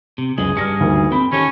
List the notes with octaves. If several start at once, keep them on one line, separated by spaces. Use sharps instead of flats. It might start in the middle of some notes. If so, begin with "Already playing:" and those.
C3
C#2 F#2 G#3 G#4 F#7
G2 G3 D4 F6 A#6 C#7
D2 D#3 A#3
C4 B5
D#3 C#4 G4 A4